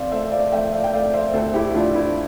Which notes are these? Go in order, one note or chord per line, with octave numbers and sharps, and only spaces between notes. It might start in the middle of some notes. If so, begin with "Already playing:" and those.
Already playing: C4 D5 F5
A3 C5 E5
D5 F5
A3 E5 G5
D5 F5
G5
A3 D5 F5
C5 E5
D2 A4 C5
E4 G4
E4
D2 D4 F4
E4